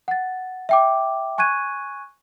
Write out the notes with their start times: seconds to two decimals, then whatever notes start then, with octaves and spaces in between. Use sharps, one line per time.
0.08 F#5 A6
0.69 E5 G5 D6
1.38 G#5 C#6 F#6 G#6 D#7